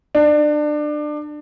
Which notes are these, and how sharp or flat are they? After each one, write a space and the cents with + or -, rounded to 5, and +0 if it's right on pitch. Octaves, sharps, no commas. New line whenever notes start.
D4 +25